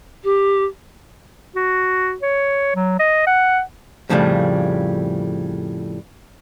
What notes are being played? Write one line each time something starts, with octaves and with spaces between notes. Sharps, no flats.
G4
F#4
C#5
F#3
D#5
F#5
F2 A2 C#3 F3 G3